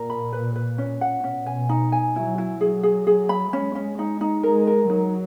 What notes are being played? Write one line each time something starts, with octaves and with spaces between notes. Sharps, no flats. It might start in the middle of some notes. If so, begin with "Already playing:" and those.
Already playing: A#2 A#4
B5
B4
B4
C#4
F#5
B2 C#4
G#5
D#4
G#5
F#3 E4
E4
F#3 G#4
G#4
G#4
B5
G#3 C#4
C#4
D#4
D#4
G#3 A#4
A#4
F#3 D#4